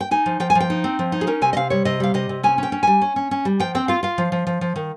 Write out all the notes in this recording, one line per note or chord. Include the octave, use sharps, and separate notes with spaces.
G5
D#4 G#5
F3
F3 G5
G#5
F3
G5
D#4
C4
F3
D#4
G#4
C#4 A#4
C3 G#5
D#5
C3 F5
G3 C#5
C3 D#5
G3 F5
C3 D#5
C3
C#4 G#5
C#4 G5
C#4
G3 G#5
C#4
C#4
C#4
G3
F3 G5
C4 G5
F4 F5
F4 F5
F3
F3
F3
F3
D#3